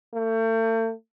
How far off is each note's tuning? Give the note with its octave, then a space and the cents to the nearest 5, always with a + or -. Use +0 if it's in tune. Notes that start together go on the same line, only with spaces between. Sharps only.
A3 +40